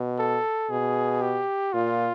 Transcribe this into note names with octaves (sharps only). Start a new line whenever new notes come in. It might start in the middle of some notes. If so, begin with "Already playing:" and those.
Already playing: B2
A4
B2 G#4
G4
A#2 F4